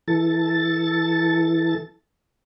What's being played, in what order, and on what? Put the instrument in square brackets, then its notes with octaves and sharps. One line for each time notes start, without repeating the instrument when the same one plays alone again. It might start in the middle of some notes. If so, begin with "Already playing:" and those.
[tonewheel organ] E3 A4 A6